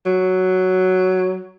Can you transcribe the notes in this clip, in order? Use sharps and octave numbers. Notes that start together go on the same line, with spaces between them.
F#3